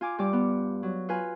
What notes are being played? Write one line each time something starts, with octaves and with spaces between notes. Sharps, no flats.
F4 G#5 D6
G2 G3 D5 D6
B3
F#3
F4 B4 G#5